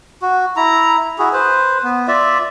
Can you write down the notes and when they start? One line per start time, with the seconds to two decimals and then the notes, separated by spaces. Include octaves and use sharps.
0.22 F#4
0.56 E4 A#5
1.18 E4 F#4 G#4
1.33 B4 C5
1.83 B3
2.07 F4 D5 E5